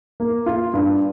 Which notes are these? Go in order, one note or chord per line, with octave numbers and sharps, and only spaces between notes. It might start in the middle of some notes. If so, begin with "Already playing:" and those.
A#3
F4
G2